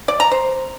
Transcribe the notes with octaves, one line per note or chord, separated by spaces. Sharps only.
D5
A#5
C5